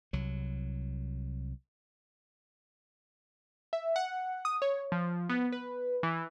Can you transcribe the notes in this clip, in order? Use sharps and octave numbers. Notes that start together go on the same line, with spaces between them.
C2 F#3
E5
F#5
D#6
C#5
F3
B3
B4
E3